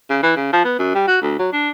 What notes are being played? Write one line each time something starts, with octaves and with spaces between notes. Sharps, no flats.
C#3
E3
C#3
F3
B3
F#2
G3
F#4
D2
F#3
D4